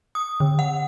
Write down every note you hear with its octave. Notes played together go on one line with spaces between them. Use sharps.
D#6
D3
F#5